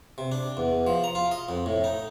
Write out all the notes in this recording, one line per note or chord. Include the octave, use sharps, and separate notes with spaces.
C3
D4
E2
F3
A#5
F4
D#5
F2
A2
D#4